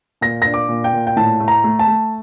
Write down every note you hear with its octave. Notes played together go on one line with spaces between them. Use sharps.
A#2 A#6
D4 A#6
D6
A#2
G5
A#2
G5
A2 A5
A3
A#5
A3
A5
A3